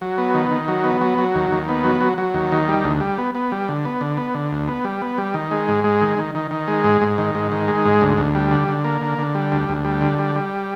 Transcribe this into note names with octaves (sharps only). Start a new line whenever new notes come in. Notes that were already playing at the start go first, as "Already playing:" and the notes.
F#3
B3
D#3
D#3
F#3
B3
F#3
F#3
D#2
D#2
B3
F#3
F#3
F#3
D#2
D#3
G3
D2
G3
B3
B3
G3
D3
B3
D3
B3
D3
D2
B3
G3
B3
G3
D#3
G#3
G#2
G#3
D#3
D#3
D#3
D#3
G#3
G#2
G#2
D#3
G#2
D#3
G#3
G#2
D2
D2
G3
D3
D3
A#3
D3
D3
G3
D2
D2
G3
D3
G3
G3